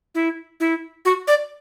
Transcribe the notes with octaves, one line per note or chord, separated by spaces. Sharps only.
E4
E4
F#4
D5